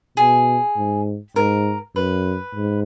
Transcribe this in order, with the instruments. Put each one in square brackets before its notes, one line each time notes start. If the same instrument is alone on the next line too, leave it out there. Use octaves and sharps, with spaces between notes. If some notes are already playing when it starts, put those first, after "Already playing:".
[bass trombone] B2 [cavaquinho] G#4
[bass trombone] G#2
[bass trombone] G#2 [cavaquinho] A#4
[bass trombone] F#2 [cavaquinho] B4
[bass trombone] G#2